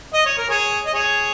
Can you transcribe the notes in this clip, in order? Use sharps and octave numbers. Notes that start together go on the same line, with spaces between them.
D#5
C#5
A#4
G#4 C#5
D#5
G#4 C#5